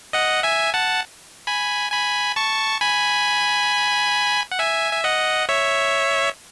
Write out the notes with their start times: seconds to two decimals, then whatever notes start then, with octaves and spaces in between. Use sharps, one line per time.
0.13 D#5 F#5
0.43 E5 G#5
0.74 F#5 A5
1.47 G#5 B5
1.92 G#5 B5
2.36 A5 C#6
2.81 G#5 B5
4.52 F#5
4.59 E5 G#5
4.93 E5
5.04 D#5 F#5
5.49 C#5 E5